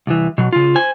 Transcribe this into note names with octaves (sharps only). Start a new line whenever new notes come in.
C2 E3
B2 F#3
C#3 F4
C5 G#5